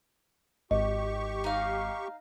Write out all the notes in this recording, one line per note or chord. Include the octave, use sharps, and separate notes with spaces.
G#1 G4 D#5 C#6
D#4 F5